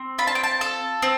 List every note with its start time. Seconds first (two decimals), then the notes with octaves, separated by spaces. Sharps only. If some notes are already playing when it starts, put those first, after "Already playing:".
Already playing: C4
0.18 F4 B5
0.27 A5
0.35 G5
0.43 A5
0.61 A4
1.02 C4